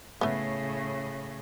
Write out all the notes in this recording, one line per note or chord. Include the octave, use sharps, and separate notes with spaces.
A2 C#3 A3 B3